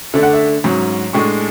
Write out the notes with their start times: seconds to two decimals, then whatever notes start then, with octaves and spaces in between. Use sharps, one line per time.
0.14 D3 A3 D4 E5
0.23 F#5
0.33 E5
0.64 G#2 F#3 C#4
1.13 A2 G#3 D4 C#6